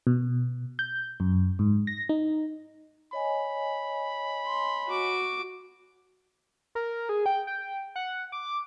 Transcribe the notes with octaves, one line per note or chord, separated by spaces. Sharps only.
B2
G6
F#2
G#2
A#6
D#4
C#5 D#5 G#5 B5
C6
F#4 D6
A#4
G#4
G5
G5
F#5
D6